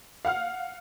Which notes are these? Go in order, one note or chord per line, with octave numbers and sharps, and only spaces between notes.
F5 F#5 F6